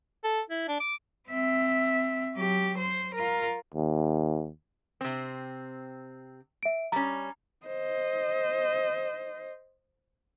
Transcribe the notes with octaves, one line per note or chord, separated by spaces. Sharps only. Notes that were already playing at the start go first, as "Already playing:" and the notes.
A4
E4
D4
D6
C4 E5
F#3 G4
C5
F4 A#4
D#2
C3 C4
E5 D7
G3 C#4 A#5
C5 D#5